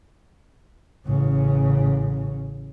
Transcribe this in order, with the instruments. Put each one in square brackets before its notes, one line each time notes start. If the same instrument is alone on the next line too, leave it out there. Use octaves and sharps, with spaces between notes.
[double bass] A1 C#3